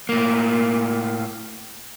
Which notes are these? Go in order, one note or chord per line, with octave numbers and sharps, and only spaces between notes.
A2 A#3